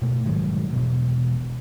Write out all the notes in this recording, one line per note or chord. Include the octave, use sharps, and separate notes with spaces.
B2 A3
G#2 D#3 F#3 G3
E1 B2